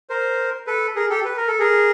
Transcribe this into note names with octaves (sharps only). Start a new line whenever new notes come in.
A#4 C5
A4 B4
G#4 A#4
G4 A4
B4
A#4
A4
G#4 A#4